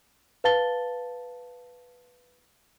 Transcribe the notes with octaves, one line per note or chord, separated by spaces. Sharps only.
B4 F5 A5 A6 G7